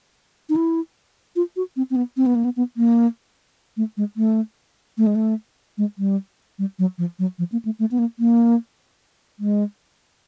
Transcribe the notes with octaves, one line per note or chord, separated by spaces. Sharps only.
D#4
E4
F4
F#4
C4
C4
B3
C4
B3
A#3
B3
B3
A#3
A3
G#3
A3
A3
G#3
A3
G#3
G3
G3
F#3
F3
F#3
F3
A#3
A3
A3
B3
A#3
A#3
G#3